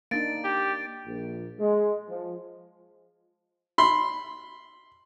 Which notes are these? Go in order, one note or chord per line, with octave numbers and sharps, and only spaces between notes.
A#3 D4 D#4 A6 D7
G4
A#1
G#3
F3
B5 C6